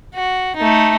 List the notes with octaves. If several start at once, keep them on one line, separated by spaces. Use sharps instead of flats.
F#4
A3 D#4